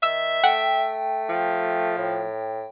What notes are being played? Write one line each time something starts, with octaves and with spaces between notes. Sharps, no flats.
D#3 E5 E6
A3 F#5 G5
F3
A2